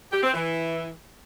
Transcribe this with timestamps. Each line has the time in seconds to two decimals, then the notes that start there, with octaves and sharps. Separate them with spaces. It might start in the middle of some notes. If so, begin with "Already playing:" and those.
0.11 G4
0.22 C4
0.33 E3